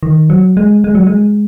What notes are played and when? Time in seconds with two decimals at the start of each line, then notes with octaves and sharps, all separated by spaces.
0.03 D#3
0.30 F#3
0.57 G#3
0.84 G#3
0.95 F#3
1.07 G#3